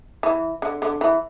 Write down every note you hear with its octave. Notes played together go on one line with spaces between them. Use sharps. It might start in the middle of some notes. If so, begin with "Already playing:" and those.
E3
D3
D3
E3